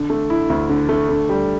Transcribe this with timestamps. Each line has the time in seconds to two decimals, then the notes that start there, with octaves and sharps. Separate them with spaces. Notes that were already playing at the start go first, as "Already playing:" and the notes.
Already playing: D3
0.10 A3
0.30 E4
0.49 D2
0.69 D3
0.89 A3
1.09 D3
1.29 G3